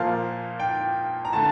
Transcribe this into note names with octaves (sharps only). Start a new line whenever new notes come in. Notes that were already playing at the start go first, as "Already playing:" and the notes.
Already playing: A#2 F3 A#3 F5
G5
A#5
D3 A3 A5